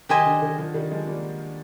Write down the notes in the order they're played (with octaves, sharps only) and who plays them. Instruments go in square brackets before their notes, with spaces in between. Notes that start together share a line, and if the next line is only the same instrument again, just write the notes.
[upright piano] D#3 [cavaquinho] G4 C5 D#5 G#5
[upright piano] D3
D#3
D3 F3
D#3 G3
F3 G#3
G3 A#3